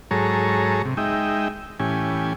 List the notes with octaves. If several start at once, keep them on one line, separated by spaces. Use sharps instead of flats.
G#2 F#3 G#4 A4 C#5 A#5
C3
G#3 D#4 E5 G5
A2 E3 C#4 G4 G#5